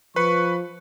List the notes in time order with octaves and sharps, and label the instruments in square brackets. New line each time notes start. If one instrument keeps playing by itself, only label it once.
[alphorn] F3 [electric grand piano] B4 [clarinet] C#6